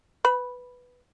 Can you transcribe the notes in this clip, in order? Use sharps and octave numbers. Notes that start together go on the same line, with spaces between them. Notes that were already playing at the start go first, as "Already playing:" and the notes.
B4 B5